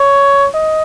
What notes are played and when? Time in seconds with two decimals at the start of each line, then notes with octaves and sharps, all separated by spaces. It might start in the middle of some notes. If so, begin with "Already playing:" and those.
Already playing: C#5
0.54 D#5